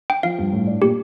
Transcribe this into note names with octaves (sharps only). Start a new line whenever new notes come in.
G5
F3 F5
G2
A2
D4
A#2 G4